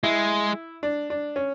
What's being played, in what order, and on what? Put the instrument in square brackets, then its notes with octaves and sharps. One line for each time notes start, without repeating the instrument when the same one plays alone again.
[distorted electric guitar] G#3 [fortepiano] E4
[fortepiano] D4
D4
C#4